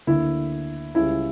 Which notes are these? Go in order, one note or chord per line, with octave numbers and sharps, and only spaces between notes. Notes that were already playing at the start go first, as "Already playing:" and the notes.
D2 D3 A#3 E4
C#2 C#3 G3 E4